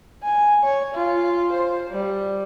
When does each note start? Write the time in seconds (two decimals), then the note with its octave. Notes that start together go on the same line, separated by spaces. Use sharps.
0.23 G#5
0.63 C#5
0.94 F4
1.52 C5
1.90 G3